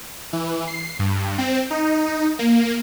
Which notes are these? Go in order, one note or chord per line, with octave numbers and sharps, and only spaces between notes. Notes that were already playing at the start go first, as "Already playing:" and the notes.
E3
C7
G2
C4
D#4
A#3